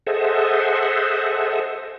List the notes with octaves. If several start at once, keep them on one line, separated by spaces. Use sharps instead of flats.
G#4 A4 C5 D#5 E5 F#5